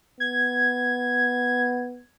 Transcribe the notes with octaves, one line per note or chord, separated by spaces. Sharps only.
B3 G#6